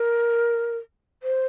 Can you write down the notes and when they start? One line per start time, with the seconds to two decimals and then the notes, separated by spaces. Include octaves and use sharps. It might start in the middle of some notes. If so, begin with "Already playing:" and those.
Already playing: A#4
1.23 C5